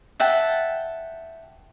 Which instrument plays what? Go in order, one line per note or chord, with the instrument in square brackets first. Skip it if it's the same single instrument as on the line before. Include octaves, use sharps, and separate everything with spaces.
[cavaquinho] E5 F#5 G5 A5